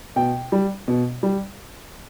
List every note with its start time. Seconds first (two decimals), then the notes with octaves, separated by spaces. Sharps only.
0.16 B2 G5
0.52 G3
0.88 B2
1.23 G3